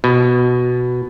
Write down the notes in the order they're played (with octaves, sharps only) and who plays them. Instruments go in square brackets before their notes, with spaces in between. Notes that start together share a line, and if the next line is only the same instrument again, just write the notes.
[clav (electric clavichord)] B2